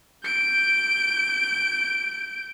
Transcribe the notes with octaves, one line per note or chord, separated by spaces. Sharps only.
G6 D7